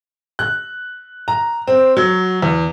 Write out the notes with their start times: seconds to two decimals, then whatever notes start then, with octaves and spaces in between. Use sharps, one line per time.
0.39 F#6
1.28 A#5
1.67 C4
1.97 F#3
2.42 E2